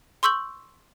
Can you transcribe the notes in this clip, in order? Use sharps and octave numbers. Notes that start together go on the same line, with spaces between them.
C6 C#6 E6 G6 F#7